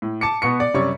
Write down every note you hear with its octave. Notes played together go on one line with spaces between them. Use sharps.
A2
A5 D6 C#7
B2 B3 C#6 C#7
D5
F#2 C3 G3 C#5 D5 C#6